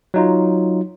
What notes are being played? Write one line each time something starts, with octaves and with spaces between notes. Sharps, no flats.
F#3 D#4 F4